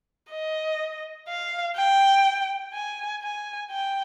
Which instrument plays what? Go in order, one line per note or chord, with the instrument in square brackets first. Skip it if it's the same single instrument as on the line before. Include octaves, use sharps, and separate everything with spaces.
[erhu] D#5
F5
G5
G#5
G#5
G5